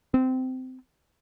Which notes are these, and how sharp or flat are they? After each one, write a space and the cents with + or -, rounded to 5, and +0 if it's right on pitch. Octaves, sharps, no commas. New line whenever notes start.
C4 -20